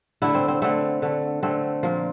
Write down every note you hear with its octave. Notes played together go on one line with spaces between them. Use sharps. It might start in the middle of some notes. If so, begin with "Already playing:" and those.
D3 A3 E4
C4
C4
D3 A3 C4
D3 A3
D3 A3 C4
A#2 F3 A#3